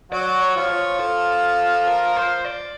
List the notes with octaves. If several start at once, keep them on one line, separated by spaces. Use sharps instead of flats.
F#3 F#4 D5
C#5
F3 F4
C#5
A4
A4
A#4
C5
D5